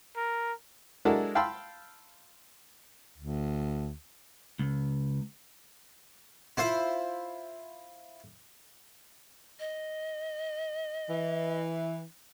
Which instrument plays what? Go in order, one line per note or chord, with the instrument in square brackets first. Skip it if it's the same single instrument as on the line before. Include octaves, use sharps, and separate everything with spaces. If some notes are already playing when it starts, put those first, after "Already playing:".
[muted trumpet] A#4
[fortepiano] G#3 D4 E4 F#4 A4 A#4
F5 G5 A5 B5 C6 E6
[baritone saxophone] D2
[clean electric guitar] C#2
[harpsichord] E4 F4 C5
[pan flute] D#5
[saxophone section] E3